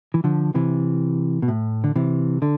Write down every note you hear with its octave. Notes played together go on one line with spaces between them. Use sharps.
E3
D3 F3
C3 E3
B2
A2
D3
C3 E3
D3